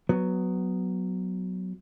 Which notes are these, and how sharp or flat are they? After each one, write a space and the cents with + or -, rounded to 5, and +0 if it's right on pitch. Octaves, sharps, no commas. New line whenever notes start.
F#3 +0 B3 +10